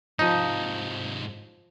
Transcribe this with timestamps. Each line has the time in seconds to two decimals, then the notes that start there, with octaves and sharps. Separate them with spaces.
0.19 G#2 C3 F3 D#4 D#5